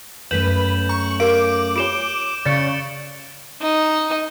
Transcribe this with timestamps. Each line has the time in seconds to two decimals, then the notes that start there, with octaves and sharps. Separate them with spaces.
0.31 F#2 A3 C#4 B4 G6 E7 F#7
0.89 A#5 C#6
1.20 G4 A#4 F5 D6 D7
1.76 F4 G4 C#5 D7 E7 G7
2.45 C#3 D5 A6 C#7
3.61 D#4